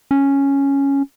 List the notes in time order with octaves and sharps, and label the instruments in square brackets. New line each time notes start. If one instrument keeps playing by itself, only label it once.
[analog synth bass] C#4